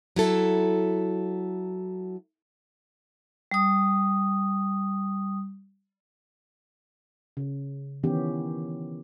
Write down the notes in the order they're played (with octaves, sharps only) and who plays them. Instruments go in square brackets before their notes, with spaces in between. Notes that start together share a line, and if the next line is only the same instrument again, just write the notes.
[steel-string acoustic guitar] F#3 E4 A4
[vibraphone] G3 D#6
[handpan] C#3
D#3 E3 B3 C#4 G4